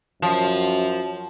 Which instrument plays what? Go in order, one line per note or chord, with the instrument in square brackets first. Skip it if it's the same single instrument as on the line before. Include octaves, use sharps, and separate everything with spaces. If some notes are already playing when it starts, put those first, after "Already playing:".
[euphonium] F#2 [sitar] F3